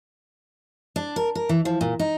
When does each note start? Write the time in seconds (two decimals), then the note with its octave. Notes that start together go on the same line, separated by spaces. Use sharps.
0.96 D4
1.16 A#4
1.35 A#4
1.49 E3
1.65 F3
1.81 A#2
1.99 D#4